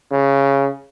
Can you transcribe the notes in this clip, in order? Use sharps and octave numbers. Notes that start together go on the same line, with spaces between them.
C#3